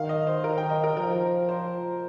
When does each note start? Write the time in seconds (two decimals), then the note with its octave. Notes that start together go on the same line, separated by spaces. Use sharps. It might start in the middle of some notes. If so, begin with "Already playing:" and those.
Already playing: D#3 F5
0.09 D#5
0.27 C5
0.44 D#3 A#4
0.58 G5
0.70 D#5
0.84 A#4
0.97 F3 A#4
1.49 C5